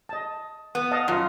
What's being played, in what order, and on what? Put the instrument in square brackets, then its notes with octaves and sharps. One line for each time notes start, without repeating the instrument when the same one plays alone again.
[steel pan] D#5 A5
[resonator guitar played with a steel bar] B3
[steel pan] D#5 F5 A5
[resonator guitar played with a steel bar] F#2 [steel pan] F4 D#5